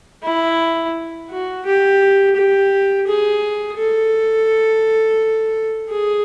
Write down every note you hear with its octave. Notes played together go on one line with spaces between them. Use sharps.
E4
F#4
G4
G4
G#4
A4
G#4